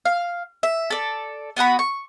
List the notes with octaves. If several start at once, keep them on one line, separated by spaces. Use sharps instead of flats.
F5
E5
A4 D5
B3 F#4 F#5 B5
C#6